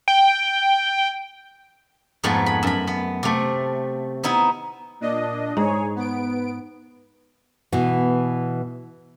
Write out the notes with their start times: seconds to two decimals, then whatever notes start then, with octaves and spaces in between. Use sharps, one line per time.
0.08 G5
2.24 F2 G#2 G#3 A3 B3
2.46 B5
2.63 F#2 B5
2.87 B3
3.23 C3 A3
4.24 B3 D#4 E4
5.00 A#2 D4 D#5
5.57 G#2 G#4 C#5
5.96 B3 D7
7.72 B2 E3